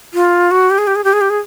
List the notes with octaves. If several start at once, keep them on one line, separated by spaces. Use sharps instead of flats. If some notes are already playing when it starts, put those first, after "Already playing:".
F4
F#4
G4
G#4
G4
G#4
G4
G#4
G4
G#4